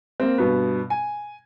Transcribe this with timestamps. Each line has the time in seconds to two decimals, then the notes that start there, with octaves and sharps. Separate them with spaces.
0.20 A#3 C4
0.38 G2 B2 B3
0.90 G#5